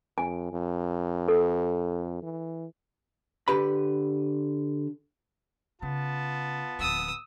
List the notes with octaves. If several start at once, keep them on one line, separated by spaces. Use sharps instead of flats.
F2 G#5
F2
A4
E3
D3 G4 B4 B5
C#3 B3 F4 A5
D1 F3 D#6 E6